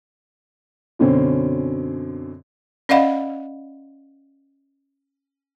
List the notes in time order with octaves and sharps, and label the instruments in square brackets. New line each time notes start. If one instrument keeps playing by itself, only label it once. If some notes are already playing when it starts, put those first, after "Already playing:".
[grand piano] F#2 B2 D3 C4 C#4
[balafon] C#4 D5 D#5 F5 F#5 B5